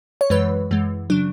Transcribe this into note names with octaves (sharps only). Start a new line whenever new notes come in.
C#5
F#2 E3 G#3 B4
F#2 E3 G#3
C#3 F#3 D4